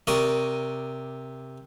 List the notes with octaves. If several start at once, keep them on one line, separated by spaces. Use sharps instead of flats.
C3 A#4 D5 C#6 D#6